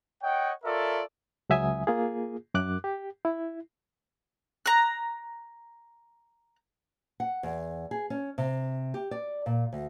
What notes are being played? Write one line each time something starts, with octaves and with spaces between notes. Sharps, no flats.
C#5 D#5 F#5 G5
F4 A4 A#4 C#5 D5 E5
C#2 F#3 E5 G#5 D#6
A#3 F4 G#4
F#2 D6 F#6
G4
E4
A#5 F#6
F#5
E2
G#4
C#4
C3
G4
D5
A#2
D2